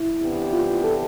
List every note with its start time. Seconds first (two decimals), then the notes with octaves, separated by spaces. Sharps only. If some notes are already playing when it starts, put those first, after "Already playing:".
Already playing: E4
0.22 C3 E3 B3 D4 G4
0.53 F4
0.84 A4